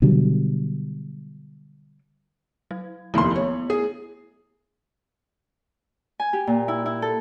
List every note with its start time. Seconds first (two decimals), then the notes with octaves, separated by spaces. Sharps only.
0.02 B2 D3 F#3 G3
2.71 F#3
3.14 F1 D#2 A3 B3 E4 C6
3.36 C#5
3.70 G#4
6.20 G#5
6.33 G4
6.47 A#2
6.68 E4
6.86 E4
7.02 A4